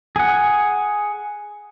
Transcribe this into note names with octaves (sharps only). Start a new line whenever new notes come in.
G#4 F#5